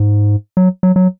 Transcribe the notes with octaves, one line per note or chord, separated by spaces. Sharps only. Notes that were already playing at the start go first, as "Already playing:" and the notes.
Already playing: G#2
F#3
F#3
F#3